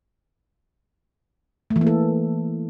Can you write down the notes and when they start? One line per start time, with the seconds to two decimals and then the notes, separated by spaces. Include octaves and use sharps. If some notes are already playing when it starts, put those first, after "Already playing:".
1.70 A3
1.76 E3
1.81 A#3
1.87 A4